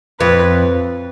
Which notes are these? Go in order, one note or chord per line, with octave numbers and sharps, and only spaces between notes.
F2 B4